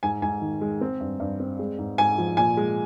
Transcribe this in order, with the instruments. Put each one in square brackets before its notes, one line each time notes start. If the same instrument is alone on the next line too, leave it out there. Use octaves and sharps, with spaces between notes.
[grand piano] G#2 G#5
G#2 G#5
D#3
G#3
C4
G2
G2
C4
G#3
G#2
G#2 G#5
F3
A#2 G#5
G#3